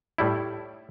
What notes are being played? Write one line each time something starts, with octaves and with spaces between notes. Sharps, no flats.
A2 G3 E4